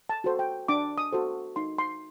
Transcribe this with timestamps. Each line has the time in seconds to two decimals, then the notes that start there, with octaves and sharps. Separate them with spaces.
0.09 A5
0.24 F#4 A4 C5
0.39 G5
0.68 D4 D6
0.98 D#6
1.12 F#4 A4 C5
1.56 D#4 C6
1.78 C6